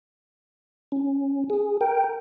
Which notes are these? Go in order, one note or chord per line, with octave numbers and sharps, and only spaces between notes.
C#4
G#4
A#4 G5